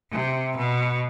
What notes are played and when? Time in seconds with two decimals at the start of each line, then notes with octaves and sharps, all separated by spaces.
0.12 C3
0.57 B2